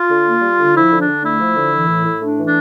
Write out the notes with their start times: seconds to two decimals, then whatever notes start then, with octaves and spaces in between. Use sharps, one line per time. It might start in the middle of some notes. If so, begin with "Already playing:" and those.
Already playing: F4
0.09 D3
0.26 A#3
0.41 G3
0.58 D3
0.75 F3 E4
0.91 D3
1.00 D4
1.07 D3
1.23 A3 E4
1.40 F3
1.56 D3
1.73 E3
1.88 A2
2.05 A2
2.21 A3 D4
2.38 E3
2.46 D4